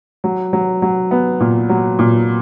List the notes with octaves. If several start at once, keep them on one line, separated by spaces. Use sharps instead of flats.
F#3
F#3
F#3
B3
A#2
F#3
A#2